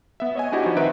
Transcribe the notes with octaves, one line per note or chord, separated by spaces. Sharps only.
B3 E5
C#5 D#5 G#5
D4 E4 F#4 G4 D#5
F3 D#4
D#3 C4 B4 E5 F#5 D7